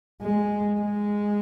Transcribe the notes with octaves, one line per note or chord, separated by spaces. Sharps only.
G#3
G#3